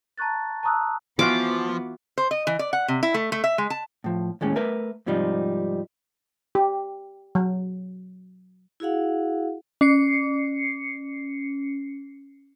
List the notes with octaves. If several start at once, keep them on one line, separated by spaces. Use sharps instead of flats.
A5 A#5 C#6 F#6 A6
A5 A#5 C#6 D#6 E6 F#6
E3 F3 B3 F4 F#4 D6
C5
D#5
E3
D5
F#5
C3
E4
A3
A3
E5
G#3
A5
A2 F3
D#2 A2 G#3 C#4
A3 A#4 B4 E5
G#2 C3 F3 G3 D#4
G4
F#3
E4 F#4 G#4 F5 F#5
C#4 C7 C#7